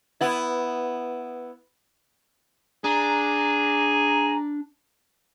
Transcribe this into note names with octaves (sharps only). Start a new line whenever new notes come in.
B3 E4
D4 G#4 A#5